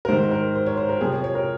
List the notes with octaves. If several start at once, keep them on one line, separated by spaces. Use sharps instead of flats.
A#4
G#2 D#3 C5
A#4
C5
C#5
C5
A#4
F2 C3 F3 G#4
C#5
C#5
A#4